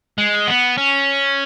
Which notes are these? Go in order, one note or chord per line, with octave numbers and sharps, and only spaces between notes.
G#3
B3
C#4